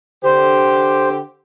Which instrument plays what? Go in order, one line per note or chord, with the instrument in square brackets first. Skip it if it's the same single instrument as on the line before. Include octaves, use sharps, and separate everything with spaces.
[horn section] D3 G4 [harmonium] C5